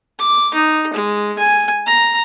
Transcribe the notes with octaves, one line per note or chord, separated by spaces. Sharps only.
D6
D#4
G#3
G#5
A#5